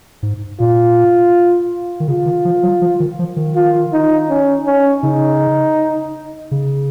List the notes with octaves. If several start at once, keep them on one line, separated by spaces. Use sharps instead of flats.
G#2
A#2 F4
D#3
C#3 F4
D#3
F3
F#3
F3
D#3
F3
D#3
F4
D#4
C#4
C#4
C#3 D#4
C#3